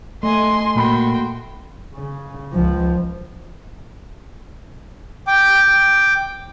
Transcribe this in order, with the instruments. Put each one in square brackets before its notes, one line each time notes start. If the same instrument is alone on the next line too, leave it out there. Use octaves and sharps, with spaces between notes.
[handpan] A3 [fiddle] D#5 G#5 [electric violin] C6
[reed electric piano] A#2 A#3 B5 [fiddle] F#4 G5
[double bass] C#3
C#2 F3
[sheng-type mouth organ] G5 D6